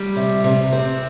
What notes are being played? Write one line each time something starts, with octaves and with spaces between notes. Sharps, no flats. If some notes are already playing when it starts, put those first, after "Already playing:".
Already playing: G3
C3
C3
C4